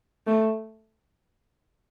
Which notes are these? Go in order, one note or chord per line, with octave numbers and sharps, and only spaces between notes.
A3